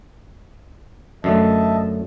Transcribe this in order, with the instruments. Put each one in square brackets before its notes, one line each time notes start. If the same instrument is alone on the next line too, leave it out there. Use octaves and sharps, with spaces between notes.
[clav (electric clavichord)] F#2 D3 A3 [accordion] D#5 E5 A5